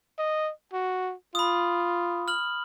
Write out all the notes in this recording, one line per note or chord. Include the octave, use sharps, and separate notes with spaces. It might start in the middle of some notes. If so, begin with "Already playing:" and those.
D#5
F#4
F4 B5 D#6
F6 F#7